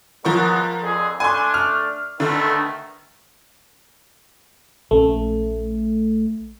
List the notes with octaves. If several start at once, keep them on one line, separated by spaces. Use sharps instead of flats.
F3 F#3 G#3 B3 A#4 C#6
F2 D3 G#4
A3 D4 G#5 C6
F6
B2 D3 D#3 A3
A#1 A3 C#4